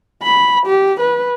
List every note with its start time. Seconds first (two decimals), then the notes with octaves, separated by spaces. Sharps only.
0.23 B5
0.66 G4
1.00 B4